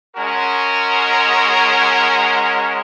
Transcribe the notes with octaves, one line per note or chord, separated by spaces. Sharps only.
G#3 C#4 F#4 A#4